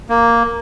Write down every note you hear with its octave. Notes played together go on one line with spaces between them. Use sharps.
A#3